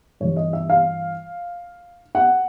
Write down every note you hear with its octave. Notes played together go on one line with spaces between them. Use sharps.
G2 E3 G3 C#5
D#5
E5
F5
F#5